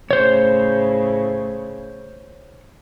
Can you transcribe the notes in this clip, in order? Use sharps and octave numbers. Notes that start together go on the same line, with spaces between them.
A2 C#3 C5 C#5